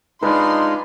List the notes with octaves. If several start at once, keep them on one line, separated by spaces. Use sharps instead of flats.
G#3 D4 D#4 F4 B4 C6